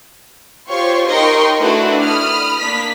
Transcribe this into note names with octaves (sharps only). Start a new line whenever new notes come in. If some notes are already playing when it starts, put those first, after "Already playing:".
F4 G4 C5 C#5 C6 C#6
D#4 A#4 D#5 G5 C6 C#6
A3 D4 E4 F#4 B4
B5 D#6 F6
A#3 D4 B6